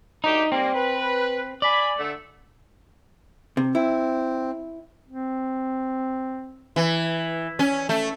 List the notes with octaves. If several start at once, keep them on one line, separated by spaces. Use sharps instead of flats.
D2 D#4 G4
G3 A#3 C4
B4
D5 G#5 B5
D3 A3
C3
C4 E4
C4
E3
C#4
A3